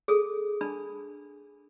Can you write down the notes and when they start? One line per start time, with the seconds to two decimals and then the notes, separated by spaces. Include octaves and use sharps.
0.08 G#4 A4
0.61 D4 A5 B5